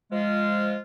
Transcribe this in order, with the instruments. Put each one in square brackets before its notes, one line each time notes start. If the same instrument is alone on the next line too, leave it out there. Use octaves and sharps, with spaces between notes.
[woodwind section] F3 G#3 F4